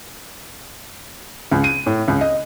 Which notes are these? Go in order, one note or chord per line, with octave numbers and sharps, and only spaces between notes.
C#2
D#7
A2
C#2
D#5